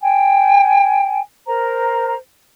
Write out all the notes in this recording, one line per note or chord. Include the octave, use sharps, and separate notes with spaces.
G5 G#5
A#4 C5 A#5